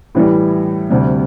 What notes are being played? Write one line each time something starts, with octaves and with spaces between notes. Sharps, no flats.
A2 E3 G3
D2 C3 G3